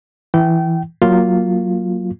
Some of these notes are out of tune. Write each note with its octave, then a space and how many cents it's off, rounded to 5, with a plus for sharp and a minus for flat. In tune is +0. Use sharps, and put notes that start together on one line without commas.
E3 +5 G5 -30
F#3 +0 A#3 -5 F4 +0